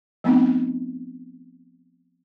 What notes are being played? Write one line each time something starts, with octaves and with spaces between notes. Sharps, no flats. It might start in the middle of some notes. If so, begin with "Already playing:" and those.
F3 A3 B3 C4 D#4